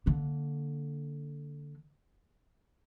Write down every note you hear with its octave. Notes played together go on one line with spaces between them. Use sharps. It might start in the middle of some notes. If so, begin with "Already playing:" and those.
D3 A#3